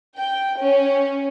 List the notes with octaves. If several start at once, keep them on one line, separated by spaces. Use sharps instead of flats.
G5
C#4